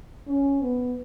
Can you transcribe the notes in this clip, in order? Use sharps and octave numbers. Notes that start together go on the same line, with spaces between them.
C#4
B3